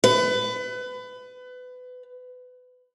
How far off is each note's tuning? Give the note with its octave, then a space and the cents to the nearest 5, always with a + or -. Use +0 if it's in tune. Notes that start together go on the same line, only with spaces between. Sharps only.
B4 +25